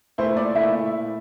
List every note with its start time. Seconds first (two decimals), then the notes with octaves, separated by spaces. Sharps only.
0.18 A#2 A3 E4 C5
0.37 D5
0.55 A#2 A3 E4 E5